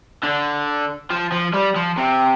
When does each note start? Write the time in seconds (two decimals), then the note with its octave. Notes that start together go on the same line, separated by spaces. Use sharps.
0.23 D3
1.10 F3
1.32 F3
1.54 G3
1.76 F3
1.98 C3